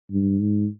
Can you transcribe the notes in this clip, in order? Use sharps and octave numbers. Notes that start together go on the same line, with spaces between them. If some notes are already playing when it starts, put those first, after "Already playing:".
G2
G#2